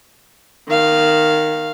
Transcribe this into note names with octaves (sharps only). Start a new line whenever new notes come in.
D#3 F5